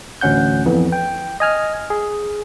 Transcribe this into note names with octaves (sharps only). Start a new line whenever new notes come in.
A1 D2 C#4 F#5 G6
F2 E3 B3
G5
D#5 G#5 F6
G#4